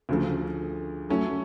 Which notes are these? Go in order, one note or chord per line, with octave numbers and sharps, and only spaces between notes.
D2 C#3 F3
F#3 A3 C#4